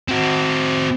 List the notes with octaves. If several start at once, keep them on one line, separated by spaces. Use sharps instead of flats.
C4 F#4